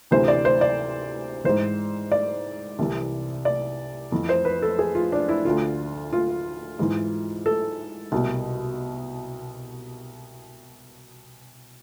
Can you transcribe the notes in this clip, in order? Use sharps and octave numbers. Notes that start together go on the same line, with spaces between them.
D2 C3 E3 C5
D5
C5
D5
G#2 E3 C5
D5
C2 C3 E3
D5
F2 E3
C5
B4
A4
G#4
F4
D4
E4
D2 D3 F4
F4
G#2 E3
A4
C2 B2